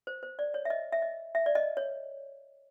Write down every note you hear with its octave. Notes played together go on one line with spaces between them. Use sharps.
C5
C5
D5
C#5
E5
D#5
E5
D#5
E5
D5
D#5
C#5